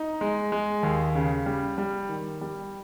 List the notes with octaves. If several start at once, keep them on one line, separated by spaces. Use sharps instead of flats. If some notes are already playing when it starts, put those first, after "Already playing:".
Already playing: D#4
G#3
G#3
D#2
C#3
G3
G3
D#3
G3